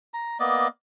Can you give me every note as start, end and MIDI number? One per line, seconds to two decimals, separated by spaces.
0.14 0.38 82
0.40 0.68 58
0.40 0.68 59
0.40 0.68 74
0.40 0.68 75